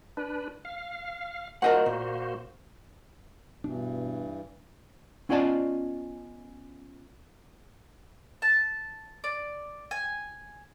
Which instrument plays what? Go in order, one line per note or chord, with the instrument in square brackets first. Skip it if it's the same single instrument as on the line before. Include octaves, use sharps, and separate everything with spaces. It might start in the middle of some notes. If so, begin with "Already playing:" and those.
[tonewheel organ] D4 B4
F5
[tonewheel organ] A#3 F#4 C5 [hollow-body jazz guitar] A#4 D#5 F#5
[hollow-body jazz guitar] A#2
[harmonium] G2 E3 [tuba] B2 [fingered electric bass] D4
[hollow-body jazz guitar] B3 C#4 F4 D5 D#5 A5
[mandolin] A5
D5
G#5